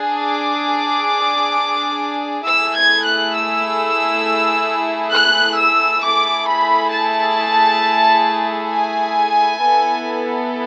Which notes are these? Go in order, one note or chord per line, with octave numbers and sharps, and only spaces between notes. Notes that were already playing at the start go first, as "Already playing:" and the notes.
Already playing: D4 G#4
D6
A3 E4 G#4 E6
G#6
F#6
E6
F#6
E6
A3 E4 G#4 D6
B5
A5
G#5
B3 E4 A4